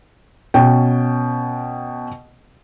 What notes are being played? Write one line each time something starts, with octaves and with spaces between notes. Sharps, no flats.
B2 C#4 G5